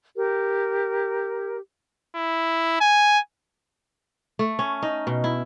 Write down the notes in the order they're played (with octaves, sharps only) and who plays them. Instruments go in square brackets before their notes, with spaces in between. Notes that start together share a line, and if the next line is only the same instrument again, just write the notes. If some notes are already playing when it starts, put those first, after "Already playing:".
[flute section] G4 A#4
[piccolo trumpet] E4
G#5
[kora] A3
C#4
D#4
B2
E4